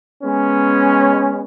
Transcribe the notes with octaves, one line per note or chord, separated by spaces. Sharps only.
G#3 B3 C#4